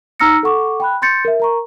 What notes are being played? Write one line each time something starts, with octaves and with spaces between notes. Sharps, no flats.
D#4 A#5 E6 F6 A#6 C#7
A4 F#5 C#6 D6
G5 B5 F#6
C6 G6 A6 C#7
A#4 E5
A#4 A#5 C#6